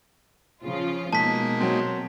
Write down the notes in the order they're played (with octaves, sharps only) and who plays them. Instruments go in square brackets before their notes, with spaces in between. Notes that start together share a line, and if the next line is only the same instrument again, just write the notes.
[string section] C#3 F3 F4
[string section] B2 [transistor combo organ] G#3 A#3 D#4 [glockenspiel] A5 B6
[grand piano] F#3 C4